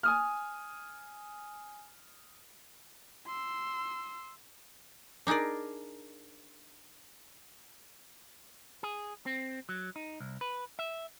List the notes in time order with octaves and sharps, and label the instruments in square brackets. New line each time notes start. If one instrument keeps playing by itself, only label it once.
[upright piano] G#5 D#6 F6
[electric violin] C6 E6
[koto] D4 D#4 G#4 A#4 D5
[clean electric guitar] G#4
C4
F#3
D#4
C2
B4
E5